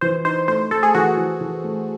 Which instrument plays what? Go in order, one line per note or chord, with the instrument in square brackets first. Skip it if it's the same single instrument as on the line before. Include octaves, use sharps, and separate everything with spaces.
[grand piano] E3 [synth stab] C5
[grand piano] D#4 [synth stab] C5
[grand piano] A3 [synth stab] C5
[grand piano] A3 [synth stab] A4
[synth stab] G#4
[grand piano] E3 [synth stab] F#4
[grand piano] E3
E3
A3